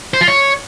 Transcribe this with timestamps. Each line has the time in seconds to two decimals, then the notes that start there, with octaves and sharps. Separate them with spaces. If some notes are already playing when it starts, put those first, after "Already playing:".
0.14 C5
0.21 F4
0.28 C#5